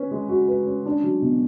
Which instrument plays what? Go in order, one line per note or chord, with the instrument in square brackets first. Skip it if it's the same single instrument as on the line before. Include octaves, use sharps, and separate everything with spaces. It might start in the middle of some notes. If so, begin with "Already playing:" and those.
Already playing: [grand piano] C#4 B4
G#3
F#4
B4
C#4
D4
F#3
B2